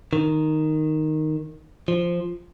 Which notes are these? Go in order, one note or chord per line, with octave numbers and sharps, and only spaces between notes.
D#3
F3